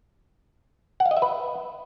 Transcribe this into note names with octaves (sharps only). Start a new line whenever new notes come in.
F#5
F5
D#5
E5
B4